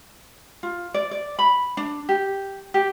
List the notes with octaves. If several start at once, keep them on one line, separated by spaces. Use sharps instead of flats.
F4
D5
D5
B5
D4
G4
G4